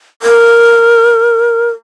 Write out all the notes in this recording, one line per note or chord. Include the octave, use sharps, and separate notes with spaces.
A#4